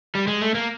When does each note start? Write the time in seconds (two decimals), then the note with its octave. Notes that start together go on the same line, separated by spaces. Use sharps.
0.15 G3
0.28 G#3
0.41 A3
0.55 A#3